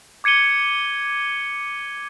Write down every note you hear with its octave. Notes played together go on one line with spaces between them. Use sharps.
D6 G#6 C#7 D#7 G7